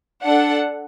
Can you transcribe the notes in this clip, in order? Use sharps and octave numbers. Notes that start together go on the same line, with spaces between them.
D4 A4 F#5